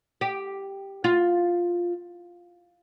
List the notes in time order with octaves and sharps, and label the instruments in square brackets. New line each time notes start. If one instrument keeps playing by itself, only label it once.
[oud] G4
F4